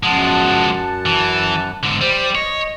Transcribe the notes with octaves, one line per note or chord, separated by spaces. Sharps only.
F#2 F3 G#3 F#5 A5
E3
G#2 D3
G3 C5
C#5 D#5